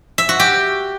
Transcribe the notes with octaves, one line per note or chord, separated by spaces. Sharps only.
E5
F#4
G4